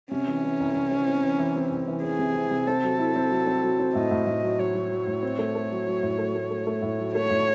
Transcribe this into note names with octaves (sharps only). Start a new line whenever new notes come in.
C3 C#4
E3
E3
C2
C3
C4
C4
E3
E3
C4
C2
E3
C4 G#4
C3
C4
C3
C4 A4
F#3
E4
C4
F#3
C4
F#3
C4
A2 D#5
A2
A2
F#3
F#3 C#5
F#3
F#3
A2
C4
A3
A3
F#3
F#3
A2
A3
A3
A3
A3
A2
F#3
A3 C#5
A2